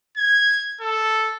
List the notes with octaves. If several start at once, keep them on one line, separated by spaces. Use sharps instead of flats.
G#6
A4